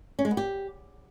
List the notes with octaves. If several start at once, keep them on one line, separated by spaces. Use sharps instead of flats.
C#4
G#3
B3
G4